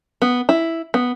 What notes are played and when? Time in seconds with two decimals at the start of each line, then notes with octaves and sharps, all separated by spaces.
0.22 B3
0.49 E4
0.94 B3